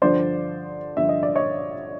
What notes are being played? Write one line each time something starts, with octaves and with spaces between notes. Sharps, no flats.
G2 D3 F3 C5 D5
G2 D3 F3 E5
D#5
D5
C#5 D#5